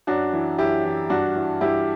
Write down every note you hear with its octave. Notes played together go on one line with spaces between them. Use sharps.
F#2 D4 F#4
E3
F#2 E4 G4
E3
G2 D4 F#4
E3
G2 E4 G4